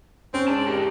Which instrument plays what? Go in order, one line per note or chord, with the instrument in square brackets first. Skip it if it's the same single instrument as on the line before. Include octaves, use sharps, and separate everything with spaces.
[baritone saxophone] C4 [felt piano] C#4
[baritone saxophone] G#2 [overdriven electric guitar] D5 A5
[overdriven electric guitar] G4 A#4